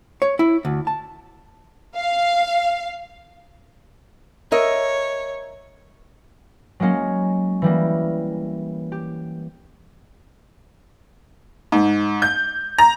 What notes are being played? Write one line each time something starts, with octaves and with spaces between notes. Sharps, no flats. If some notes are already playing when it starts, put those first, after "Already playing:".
C#5
E4
D2
A5
F5
A#4 C#5 D#5 E5
F#3 G#3 A#3 C#4
E3 G3 A#3
G4
G#2
G6
A#5